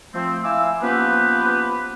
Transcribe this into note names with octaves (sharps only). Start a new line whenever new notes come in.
F3 A3 C4
E4 F5 G#5 D6 E6
F3 A#3 B3 C#4 G4 B4